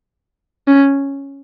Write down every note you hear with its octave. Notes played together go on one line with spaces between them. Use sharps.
C#4